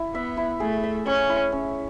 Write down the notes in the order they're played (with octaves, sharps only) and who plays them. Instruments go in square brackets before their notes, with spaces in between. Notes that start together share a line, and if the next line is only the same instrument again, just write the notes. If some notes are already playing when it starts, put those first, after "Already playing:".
Already playing: [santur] E4
[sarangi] B3 [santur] E5
[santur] E4
[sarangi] A3 [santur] G#4
[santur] E5
[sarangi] C#4 [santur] C#5
[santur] E4
C#4